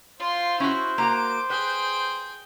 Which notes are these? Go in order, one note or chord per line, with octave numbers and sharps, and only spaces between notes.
F4 C5 C6
C#4 E4 F#4
A#3 F#4 A#5 D6
G#4 B4 G5